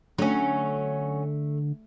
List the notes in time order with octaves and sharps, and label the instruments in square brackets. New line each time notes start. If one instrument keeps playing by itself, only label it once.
[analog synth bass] D3 [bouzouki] F#3 C#4 [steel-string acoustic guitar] A3